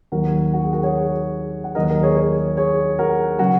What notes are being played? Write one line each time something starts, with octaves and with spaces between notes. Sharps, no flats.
D#2 D#3 F#3 F#4 A#4
F#4
G#4
F#4 A#4
G#4 C#5
F#5
D#2 D#3 F#3 A#4 D#5
A#4 D#5
G#4 C#5
G#4 C#5
G#4 C#5
F#4 A#4
C#3 F#3 F#4